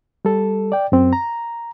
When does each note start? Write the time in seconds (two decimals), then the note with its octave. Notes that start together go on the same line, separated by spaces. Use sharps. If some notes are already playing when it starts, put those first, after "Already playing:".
0.25 G3 A4
0.72 D5 G5
0.92 F#2 C4
1.13 A#5